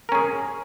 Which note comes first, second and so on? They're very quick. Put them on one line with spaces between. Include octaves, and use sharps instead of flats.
A#4 C#4 G#4